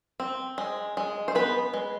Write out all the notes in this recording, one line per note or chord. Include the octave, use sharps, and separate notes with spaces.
C4
G#3
G#3
C5
B3 B4
G#3